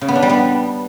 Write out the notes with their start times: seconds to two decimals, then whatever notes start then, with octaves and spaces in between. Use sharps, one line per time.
0.01 C#3
0.08 B3
0.15 D4
0.22 G3
0.30 B3